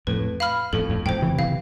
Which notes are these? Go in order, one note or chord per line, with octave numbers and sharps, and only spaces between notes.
F2 A2 B4
F5 B5 F6
F2 A2 A4
F2 A2
F2 A2 C5 G5
C3 E3
C3 E3 F5